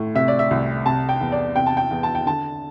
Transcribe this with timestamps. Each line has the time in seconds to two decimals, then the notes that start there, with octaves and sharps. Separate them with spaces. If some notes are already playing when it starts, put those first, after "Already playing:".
Already playing: A2
0.15 C3 E5
0.28 D5
0.39 E5
0.51 C2
0.86 C3 A5
1.09 G5
1.21 E2
1.32 D5
1.56 C3 G5
1.66 A5
1.77 G5
1.91 E2
2.03 A5
2.15 G5
2.25 D3 A5